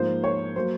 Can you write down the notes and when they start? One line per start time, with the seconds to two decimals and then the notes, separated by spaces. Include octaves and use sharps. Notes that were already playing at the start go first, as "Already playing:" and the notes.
Already playing: G#2 F3 A#3 C5
0.24 C#5
0.56 F#3 A#3 C5